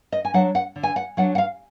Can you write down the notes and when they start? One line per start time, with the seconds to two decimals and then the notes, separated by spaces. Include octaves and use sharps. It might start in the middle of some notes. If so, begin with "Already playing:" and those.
0.12 D#5
0.25 G#5
0.34 F#3 D4 F#5
0.55 F#5
0.76 D3
0.83 G#5
0.96 F#5
1.17 F#3 D4 F#5
1.35 F#5
1.38 F5